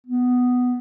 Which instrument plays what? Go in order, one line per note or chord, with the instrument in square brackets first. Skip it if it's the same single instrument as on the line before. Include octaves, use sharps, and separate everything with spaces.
[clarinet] B3